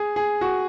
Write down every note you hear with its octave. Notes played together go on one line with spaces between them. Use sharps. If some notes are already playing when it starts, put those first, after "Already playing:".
Already playing: G#4
G#4
F#4